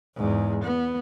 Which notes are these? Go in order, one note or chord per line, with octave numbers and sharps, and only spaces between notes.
E2 G#2
B3